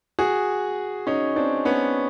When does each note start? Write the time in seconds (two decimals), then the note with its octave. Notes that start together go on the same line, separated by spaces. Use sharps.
0.19 F#4 G#4
1.07 C#4 D#4
1.36 C4 D4
1.65 B3 C#4